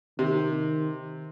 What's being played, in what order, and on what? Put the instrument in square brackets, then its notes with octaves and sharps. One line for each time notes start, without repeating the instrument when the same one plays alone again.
[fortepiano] C3 [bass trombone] D#3